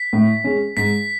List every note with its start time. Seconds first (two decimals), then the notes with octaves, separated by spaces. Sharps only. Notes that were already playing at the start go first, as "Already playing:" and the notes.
Already playing: B6
0.13 A2
0.44 G#3 C#4
0.77 G#2 B6